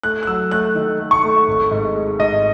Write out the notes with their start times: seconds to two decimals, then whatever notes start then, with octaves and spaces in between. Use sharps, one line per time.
0.03 A3 F#6
0.23 F#6
0.27 F#3 E6
0.51 A3 F#6
0.75 D#3
0.99 A3
1.11 C#6
1.23 A3
1.48 G#1
1.71 G#2
1.95 G#3
2.19 G#2 D#5